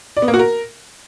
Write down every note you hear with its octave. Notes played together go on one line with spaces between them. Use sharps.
D5
B3
A#3
F#4
A#4